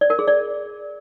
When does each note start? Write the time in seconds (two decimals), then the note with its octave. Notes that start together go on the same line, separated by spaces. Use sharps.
0.01 D5
0.10 A#4
0.19 G#4
0.28 D5